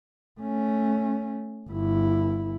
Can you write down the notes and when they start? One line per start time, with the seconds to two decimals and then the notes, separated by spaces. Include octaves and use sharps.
0.40 A3 C#4
1.69 G1 E4